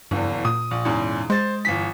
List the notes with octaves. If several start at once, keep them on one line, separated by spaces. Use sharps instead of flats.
F#1 E2 G2
A#2 D#6
A#1
E2 G#2 C#3
G#3 C5 A6
G1 E3 B6